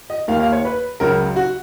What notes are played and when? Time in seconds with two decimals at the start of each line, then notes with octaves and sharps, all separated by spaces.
0.10 D#5
0.28 D#2 D#3 A#3 F5
0.40 F5
0.52 C#5
0.65 B4
1.00 C#2 C#3 F#3 A#4
1.36 F#4